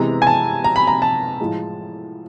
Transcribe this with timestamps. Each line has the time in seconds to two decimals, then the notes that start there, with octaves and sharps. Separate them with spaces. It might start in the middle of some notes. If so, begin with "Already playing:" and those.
Already playing: C3 E3 G#3 B3 A#5
0.22 G#5
0.27 A5
0.64 A#5
0.76 B5
0.87 A#5
1.02 A5
1.40 A2 F3 G#3